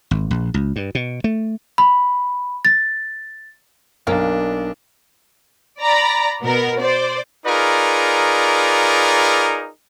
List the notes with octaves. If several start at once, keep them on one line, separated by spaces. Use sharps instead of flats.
G#1
A#1
C#2
G2
B2
A3
B5
A6
B1 A#3 D4
D5 A#5 B5
B2 B3 A#4
C5 D5
D#4 F4 G#4 A#4 B4 D5